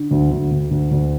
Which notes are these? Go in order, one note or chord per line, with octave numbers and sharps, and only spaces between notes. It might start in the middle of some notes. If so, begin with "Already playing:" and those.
Already playing: D3
D2
D2
D2
D2
D2